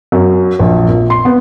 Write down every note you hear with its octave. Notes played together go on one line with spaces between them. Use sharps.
F#2
A#1
A#2
C6
B3